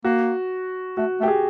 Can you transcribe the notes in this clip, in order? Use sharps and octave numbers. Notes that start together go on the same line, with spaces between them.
A#3 F#4
A3 F#4
A3 G4
G#4